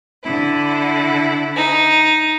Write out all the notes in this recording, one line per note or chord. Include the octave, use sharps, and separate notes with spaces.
D3 E4
D#4